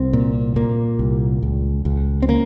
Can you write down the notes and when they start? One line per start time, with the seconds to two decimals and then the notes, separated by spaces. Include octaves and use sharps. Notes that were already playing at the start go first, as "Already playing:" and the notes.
Already playing: C2 C4
0.13 A#2
0.56 A#2 A#3
0.99 C2
1.42 C#2
1.85 C#2
2.22 C4
2.28 C#3 A#3